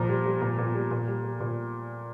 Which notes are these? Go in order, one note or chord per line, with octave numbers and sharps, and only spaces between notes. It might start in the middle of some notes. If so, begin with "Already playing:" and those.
Already playing: A#2 F3 A#5
G3
G3
A#2
A#2
G3
A#2
G3
G3
A#2